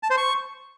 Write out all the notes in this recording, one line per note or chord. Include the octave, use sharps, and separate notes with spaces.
A5
C5
C#6